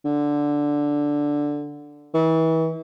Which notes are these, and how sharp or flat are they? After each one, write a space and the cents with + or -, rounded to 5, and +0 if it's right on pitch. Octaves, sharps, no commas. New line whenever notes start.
D3 -5
E3 -35